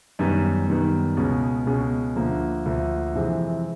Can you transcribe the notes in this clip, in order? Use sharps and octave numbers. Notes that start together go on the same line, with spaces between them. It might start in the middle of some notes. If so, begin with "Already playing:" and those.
F#2 D#3 G3 B3
F#2 D#3 G3 B3
C#2 B2 G#3 C#4
C#2 B2 G#3 C#4
D2 D3 F3 A#3
D2 D3 F3 A#3
F2 C3 E3 G#3 C4